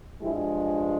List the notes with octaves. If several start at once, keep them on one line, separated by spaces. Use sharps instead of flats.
G2 F3 G#3 E4 G4